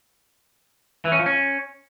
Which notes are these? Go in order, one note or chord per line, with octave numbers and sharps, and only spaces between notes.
E3
C#4
F3
C#4